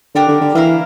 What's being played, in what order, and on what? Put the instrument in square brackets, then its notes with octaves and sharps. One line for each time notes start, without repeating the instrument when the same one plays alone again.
[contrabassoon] D3 [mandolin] D4 G4 A#4
[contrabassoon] D3
D3
[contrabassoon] E3 [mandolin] A#3 E4 A#4 F5